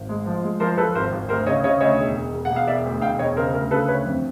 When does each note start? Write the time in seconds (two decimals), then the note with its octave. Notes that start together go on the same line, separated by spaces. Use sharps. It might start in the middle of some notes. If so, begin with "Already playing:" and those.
Already playing: G#1
0.09 G#3
0.26 F3
0.43 G#3
0.60 F3 A#4 C5
0.78 F3 A4 B4
0.95 G#1 A#4 C5
1.12 G#1
1.29 D2 A#4 C5
1.46 C#3 C#5 D#5
1.64 C#3 C#5 D#5
1.81 D2 C#5 D#5
1.98 E1
2.15 E1
2.33 E1
2.45 E1 F#5
2.56 F5
2.67 E1 D5 E5
2.85 D2
3.01 E1 F5 G5
3.19 E1 C#5 D#5
3.36 C#3 A#4 C5
3.54 D2 A#4
3.71 C#3 A4 B4
3.88 D2 B4 C#5
4.06 F2